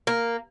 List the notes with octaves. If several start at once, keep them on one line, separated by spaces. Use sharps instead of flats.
A#3